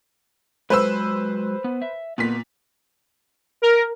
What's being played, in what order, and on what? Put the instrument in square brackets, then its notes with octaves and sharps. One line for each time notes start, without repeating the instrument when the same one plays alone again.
[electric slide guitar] F#3 G#3 [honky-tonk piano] B4 C5 E6
[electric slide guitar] B3
E5
[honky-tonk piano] A#2 B6 [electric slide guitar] B3 F4 B4
[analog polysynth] A#4